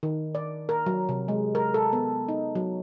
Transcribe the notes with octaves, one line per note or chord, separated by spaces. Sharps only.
D#3
D5
A#4
F#3
C3
G#3
A#4
A4
B3
D#4
F#3